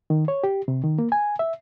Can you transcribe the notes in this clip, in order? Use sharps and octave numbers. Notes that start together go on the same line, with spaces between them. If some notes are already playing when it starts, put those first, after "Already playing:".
D#3
C#5
G4
C3
D#3
A#3
G#5
E5